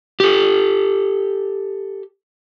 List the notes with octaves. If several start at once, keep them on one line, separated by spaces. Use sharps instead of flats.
G4 A4